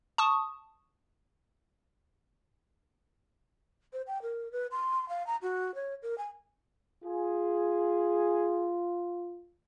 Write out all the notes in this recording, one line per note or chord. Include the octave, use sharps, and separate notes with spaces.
A5 C#6 D#6
C5
G5
A#4
B4
C6
F5
A#5
F#4
C#5
A#4
G#5
F4 G#4